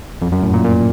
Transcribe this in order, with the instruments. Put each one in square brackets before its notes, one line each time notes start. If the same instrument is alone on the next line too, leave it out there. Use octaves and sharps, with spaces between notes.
[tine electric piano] F2
F#2
A2
A#2
A#2